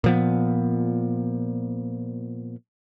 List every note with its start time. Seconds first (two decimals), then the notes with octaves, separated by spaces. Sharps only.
0.04 A#2 F3 B3